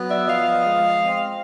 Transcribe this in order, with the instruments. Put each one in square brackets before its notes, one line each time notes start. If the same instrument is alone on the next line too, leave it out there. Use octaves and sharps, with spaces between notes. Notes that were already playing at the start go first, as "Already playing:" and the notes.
Already playing: [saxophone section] F#3 B3
D5 E5
F3 D#5 F5
G#3
C4